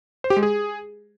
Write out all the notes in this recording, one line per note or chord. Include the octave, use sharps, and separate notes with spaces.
C5
G4
G#3
G#4